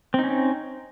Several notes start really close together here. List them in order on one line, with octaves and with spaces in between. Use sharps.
C4 D#4 C#4